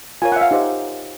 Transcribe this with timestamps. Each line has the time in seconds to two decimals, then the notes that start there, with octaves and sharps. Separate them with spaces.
0.22 F4 A#4 C#5 G#5
0.32 F#5
0.36 E5
0.41 F5
0.51 D#4 G4 C5